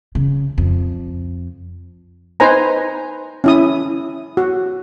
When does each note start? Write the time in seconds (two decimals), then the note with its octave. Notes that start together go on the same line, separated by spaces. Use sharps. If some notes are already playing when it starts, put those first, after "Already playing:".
0.15 C#3
0.58 F2
2.40 D#4 B4 C5 G#5 A#5
3.44 C#4 E4 D#6
4.37 F#4